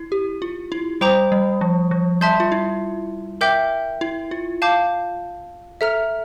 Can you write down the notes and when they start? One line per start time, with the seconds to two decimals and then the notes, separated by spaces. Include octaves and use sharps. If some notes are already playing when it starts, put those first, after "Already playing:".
Already playing: E4
0.12 G4
0.42 F4
0.72 E4
1.01 G3 C5 G5 A#5 D6 G6
1.32 G3
1.61 F3
1.91 F3
2.21 G3 E5 A5 C6 G6
2.40 F4
2.52 E4
3.41 A#4 E5 G5 D6 G6
4.01 E4
4.31 F4
4.62 F5 A5 D6 G6
5.81 A4 E5 A#5 F6